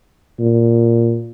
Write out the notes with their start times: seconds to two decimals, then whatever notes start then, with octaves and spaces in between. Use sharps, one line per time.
0.39 A#2